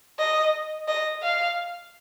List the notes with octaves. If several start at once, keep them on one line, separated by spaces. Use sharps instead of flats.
D#5
D#5
F5